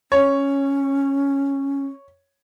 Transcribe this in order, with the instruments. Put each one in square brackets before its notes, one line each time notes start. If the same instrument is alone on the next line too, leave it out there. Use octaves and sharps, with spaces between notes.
[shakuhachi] C#4 [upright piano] C#5